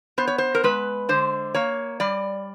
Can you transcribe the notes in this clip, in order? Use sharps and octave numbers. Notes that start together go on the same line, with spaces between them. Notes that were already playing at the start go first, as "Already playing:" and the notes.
B3 C5
C#5
C5
A#4
G#3 B4
D3 C5
A#3 C#5
G3 D5